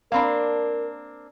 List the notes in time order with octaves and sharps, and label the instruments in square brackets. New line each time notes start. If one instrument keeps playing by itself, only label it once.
[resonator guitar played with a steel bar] A#3 C4 D4 [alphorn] A#4 [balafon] F5 B5